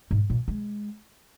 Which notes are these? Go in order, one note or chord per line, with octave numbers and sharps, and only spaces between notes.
G#2
A#2
G#3